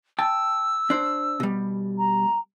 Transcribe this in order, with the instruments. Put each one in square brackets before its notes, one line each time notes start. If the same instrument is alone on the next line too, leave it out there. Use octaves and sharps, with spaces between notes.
[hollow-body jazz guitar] G5 A5 [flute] E6
[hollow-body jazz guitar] D4 C5
B2 G3
[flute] A#5